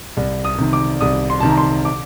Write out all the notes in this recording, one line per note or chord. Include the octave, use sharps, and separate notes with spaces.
C2
D#6
C3 D#3
D6
C2 D#6
C6
C3 D#3 A5
A#5
C6
D6